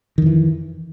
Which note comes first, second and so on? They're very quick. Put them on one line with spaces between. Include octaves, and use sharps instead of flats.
D#3 F2 E3